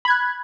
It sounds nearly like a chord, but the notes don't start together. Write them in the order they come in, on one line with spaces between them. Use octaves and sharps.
B5 G#6 F#6